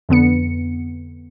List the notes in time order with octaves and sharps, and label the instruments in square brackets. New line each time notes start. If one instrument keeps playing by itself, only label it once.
[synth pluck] F2 D3 B3 C#7